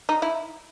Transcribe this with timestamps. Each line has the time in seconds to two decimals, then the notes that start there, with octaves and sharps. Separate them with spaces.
0.09 D#4
0.22 E4